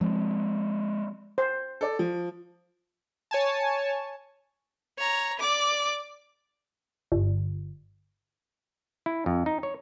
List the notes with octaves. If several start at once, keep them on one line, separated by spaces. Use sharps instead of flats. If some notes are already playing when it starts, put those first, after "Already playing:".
F3 G#3 A#3 C4
C5
A4 D5
F3
C#5 G#5 A5
C#5 A#5
D5 D6
G1
E4
F2
D#4
C#5